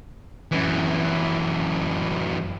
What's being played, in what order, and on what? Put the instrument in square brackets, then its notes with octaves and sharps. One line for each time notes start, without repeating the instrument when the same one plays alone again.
[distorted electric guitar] F#2 E3